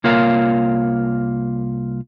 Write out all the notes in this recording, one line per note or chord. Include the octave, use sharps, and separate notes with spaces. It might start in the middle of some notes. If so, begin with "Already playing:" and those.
C2 A#3 F4 A#4 C#5 F5